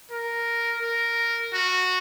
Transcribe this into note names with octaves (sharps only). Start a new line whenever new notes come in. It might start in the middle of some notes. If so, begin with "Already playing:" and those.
A#4
A#4
F#4